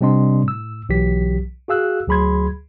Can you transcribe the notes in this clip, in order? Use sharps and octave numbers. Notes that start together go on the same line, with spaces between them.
C3 G3 C4 D4 D#5 C6
A2 E6
B1 E3 F#3 G4 B6
F#4 G#4 F5 E6 F#6
D2 F#3 G#4 B5 C6 G#6